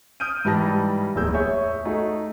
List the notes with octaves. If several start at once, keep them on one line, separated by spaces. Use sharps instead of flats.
D#6 F6 G6 D7 D#7
G#2 E3 G3 A5 A#6
D1 E2 A#3 G#4 E6 G6
G#4 C#5 E5 C#6
A3 D#4 F#4 G#4